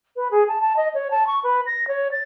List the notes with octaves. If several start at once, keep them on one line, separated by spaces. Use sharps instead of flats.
B4
G#4
A5
A5
D#5
C#5
A5
C#6
B4
A#6
C#5
A6